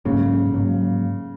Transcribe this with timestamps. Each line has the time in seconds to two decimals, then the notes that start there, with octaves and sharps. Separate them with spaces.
0.05 G#2 C#3 F#3 A#3
0.52 G#2 F#3 A#3